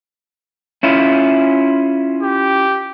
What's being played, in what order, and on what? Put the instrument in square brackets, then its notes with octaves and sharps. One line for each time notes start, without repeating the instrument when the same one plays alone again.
[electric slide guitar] C#4 E4 F4
[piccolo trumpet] G4